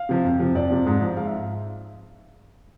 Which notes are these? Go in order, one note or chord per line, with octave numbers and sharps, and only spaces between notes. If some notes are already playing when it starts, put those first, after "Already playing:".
Already playing: F5
C3 F3
F2
C3 F3
F2 D5
C3 F3
G#2
F3
G#2 F5
E5